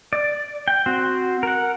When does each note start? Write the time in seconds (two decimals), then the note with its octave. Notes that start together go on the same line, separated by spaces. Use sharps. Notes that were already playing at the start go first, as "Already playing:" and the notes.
0.13 D5
0.68 G5
0.86 C4 F#4 C5
1.43 A#4 F#5